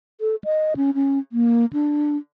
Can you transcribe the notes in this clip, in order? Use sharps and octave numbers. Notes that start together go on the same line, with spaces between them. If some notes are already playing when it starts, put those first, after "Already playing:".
A4
D#5
C#4
C#4
A#3
D4